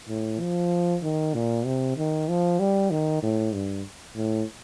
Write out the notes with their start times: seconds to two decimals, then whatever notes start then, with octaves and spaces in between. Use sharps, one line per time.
0.09 A2
0.40 F3
1.03 D#3
1.34 A#2
1.66 C3
1.97 D#3
2.29 F3
2.59 G3
2.91 D#3
3.23 A2
3.54 G2
4.16 A2